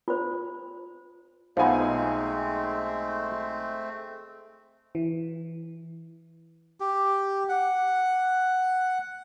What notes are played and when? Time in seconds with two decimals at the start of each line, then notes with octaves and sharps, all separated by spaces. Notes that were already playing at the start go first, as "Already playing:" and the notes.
0.08 F4 C5
1.57 B1 F3 G#3 A3 B3 C4 D#4 G#5
4.95 E3
6.80 G4
7.49 F#5